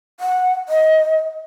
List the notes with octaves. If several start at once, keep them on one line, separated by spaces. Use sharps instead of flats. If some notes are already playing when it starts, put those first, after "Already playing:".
F#5
D#5